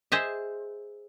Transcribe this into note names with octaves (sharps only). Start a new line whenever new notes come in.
G#4 C5 D#5 E5